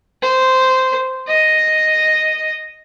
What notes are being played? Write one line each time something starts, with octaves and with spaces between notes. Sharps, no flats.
C5
D#5